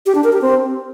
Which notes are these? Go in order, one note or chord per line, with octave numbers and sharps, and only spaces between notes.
G4
D4
A#4
G4
C4